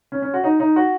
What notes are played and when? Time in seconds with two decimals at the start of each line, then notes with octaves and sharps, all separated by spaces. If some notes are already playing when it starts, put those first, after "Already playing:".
0.12 C#4
0.22 C#4
0.34 F#4
0.44 D#4
0.60 D#4
0.76 F#4